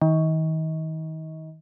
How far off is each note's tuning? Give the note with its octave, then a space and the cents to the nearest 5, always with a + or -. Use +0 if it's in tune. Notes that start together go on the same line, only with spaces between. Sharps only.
D#3 +35